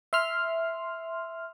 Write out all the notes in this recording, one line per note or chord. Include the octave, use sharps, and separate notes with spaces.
E5 C6 F6